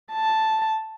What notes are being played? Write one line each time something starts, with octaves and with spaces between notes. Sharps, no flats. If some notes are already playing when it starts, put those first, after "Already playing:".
A5